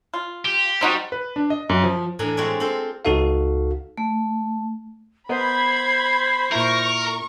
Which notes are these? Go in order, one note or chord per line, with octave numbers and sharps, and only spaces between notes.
F4
G4
G3 C4 D#4 F#4
B4
D4
D#5
F#2
F3
A2 E3 D4 A4 G#5 A#5
G#3 C4 F#4 C#5 D5 E5
C4 F4 A4 C5
C#2 D#4 F#4 A4 F5
A3
B3 A#4 C5 D#5 B5 G#6
A#2 E4 A#4 C#6